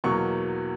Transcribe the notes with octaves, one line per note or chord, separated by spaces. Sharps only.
E2 B2 F#3 A#3 C#6